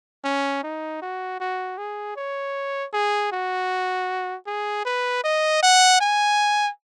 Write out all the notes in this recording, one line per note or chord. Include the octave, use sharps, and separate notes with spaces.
C#4
D#4
F#4
F#4
G#4
C#5
G#4
F#4
G#4
B4
D#5
F#5
G#5